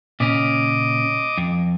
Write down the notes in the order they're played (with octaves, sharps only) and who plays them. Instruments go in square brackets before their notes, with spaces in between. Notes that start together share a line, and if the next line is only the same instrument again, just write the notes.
[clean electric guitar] A#2 C#3 C#4 [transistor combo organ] D#5 D6
[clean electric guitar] F2